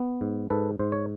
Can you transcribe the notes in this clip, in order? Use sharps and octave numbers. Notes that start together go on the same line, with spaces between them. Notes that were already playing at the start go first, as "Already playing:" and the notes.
Already playing: B3
G#2
G#2 A4 B4
G#2 C5
C#5